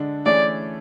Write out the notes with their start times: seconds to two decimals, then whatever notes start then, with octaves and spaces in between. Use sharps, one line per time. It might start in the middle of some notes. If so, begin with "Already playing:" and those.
Already playing: D3 G#3 D4
0.26 E3 A3 C#4 G#4 D5